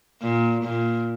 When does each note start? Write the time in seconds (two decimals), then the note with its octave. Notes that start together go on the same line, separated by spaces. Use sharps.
0.22 A#2
0.64 A#2